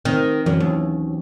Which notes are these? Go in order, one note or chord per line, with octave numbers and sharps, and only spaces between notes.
D#3 C4
F#2 E3 F#3 C#4
D#2